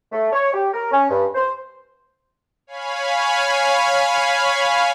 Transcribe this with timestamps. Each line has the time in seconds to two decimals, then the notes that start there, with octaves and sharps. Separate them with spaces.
0.12 A3
0.33 C#5
0.54 G4
0.74 A#4
0.92 C#4
1.10 G2
1.35 C5
2.67 C#5 F5 G#5 B5